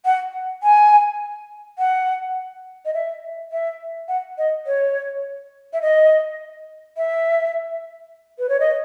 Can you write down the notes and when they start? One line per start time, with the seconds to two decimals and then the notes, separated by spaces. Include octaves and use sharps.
0.05 F#5
0.63 G#5
1.79 F#5
2.85 D#5
2.94 E5
3.52 E5
4.08 F#5
4.38 D#5
4.67 C#5
5.73 E5
5.82 D#5
6.97 E5
8.39 B4
8.49 C#5
8.60 D#5